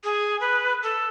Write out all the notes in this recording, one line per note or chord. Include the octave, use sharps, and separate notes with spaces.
G#4
B4
A4